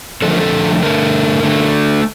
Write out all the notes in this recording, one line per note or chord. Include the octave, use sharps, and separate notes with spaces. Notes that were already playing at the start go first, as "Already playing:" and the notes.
D3 F3 A3 A4
A#4
A4
D3 A3 A#4
D3 A3